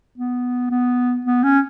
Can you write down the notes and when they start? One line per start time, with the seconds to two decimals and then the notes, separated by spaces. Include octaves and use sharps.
0.18 B3
0.71 B3
1.25 B3
1.43 C#4